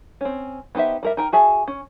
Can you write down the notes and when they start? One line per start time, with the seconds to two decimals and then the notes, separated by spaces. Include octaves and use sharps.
0.21 C4 C#4
0.75 B3 D#4 G4 C5 E5
1.03 G3 A#4 E5
1.17 D#4 A#4 G5
1.33 F#4 G#4 E5 A5
1.68 C#4